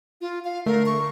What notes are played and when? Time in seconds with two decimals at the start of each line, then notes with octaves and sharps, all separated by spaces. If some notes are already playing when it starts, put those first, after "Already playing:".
0.21 F4
0.44 F5
0.66 D3 A3 A#4 C7
0.86 C#6